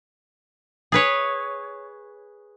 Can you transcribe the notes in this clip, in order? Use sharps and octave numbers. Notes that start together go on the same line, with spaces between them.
G#4 B4 C#5